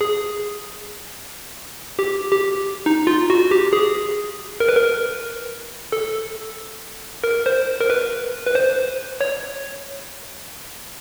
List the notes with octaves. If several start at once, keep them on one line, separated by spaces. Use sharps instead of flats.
G#4
G4
G4
D#4
F4
F#4
G4
G#4
A#4
B4
A#4
A4
A#4
C5
A#4
B4
B4
C5
C#5